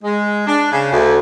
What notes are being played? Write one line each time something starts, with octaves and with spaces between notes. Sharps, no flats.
G#3
D4
C#3
D2